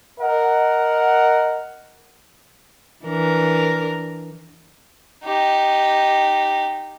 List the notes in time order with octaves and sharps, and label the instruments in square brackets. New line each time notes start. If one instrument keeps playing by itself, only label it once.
[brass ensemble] A#4 D#5 F#5
[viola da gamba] E3 D4 A#4
[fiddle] D#4 G4